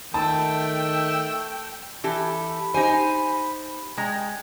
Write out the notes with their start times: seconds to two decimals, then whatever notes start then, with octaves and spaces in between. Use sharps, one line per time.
0.14 D#3 A3 G5 A5 E6
2.04 E3 G4 A4 B5
2.74 D#4 G4 C5 G#5
3.97 G#3 G5 A#5